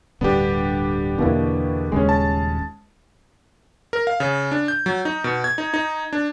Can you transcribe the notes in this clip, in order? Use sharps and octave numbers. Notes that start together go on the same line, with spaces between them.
D1 G2 D3 B3 D4 G4
E2 B2 D3 A#3 E4
D#1 C#3 G#3 C#4
A5
A#4
F5
C#3
D4
G6
F#3
D#4
B2
G#6
D#4
D#4
D4